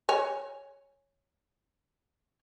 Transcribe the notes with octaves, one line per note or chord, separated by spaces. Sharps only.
C#5 G#5